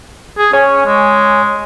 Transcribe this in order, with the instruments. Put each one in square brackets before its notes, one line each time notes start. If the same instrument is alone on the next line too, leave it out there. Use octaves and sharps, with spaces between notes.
[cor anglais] G#4
[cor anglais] C#4 [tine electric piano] C#5 G#5 C#6
[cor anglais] G#3